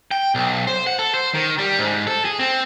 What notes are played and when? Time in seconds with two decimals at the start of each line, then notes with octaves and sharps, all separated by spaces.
0.11 G5
0.35 B1
0.67 C5
0.87 F#5
0.99 A4
1.14 C5
1.34 D#3
1.59 G3
1.79 G#2
2.07 A4
2.25 G#4
2.39 C4